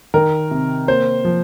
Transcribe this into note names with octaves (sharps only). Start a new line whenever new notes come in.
D#3 A#4
C3
A#3 C5
F3